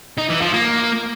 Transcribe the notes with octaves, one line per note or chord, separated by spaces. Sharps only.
D#4
E3
F3
A#3